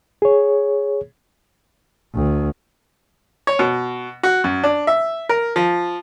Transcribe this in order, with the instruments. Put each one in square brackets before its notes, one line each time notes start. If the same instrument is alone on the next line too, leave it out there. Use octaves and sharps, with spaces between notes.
[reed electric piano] G#4 C#5
[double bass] D2
[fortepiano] C#5
B2
F#4
F#2
D4
E5
A#4
F3